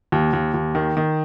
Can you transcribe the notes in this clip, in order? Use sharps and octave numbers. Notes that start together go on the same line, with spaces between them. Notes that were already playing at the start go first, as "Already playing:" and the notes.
D#2
D#2
D#2
D#3
D#3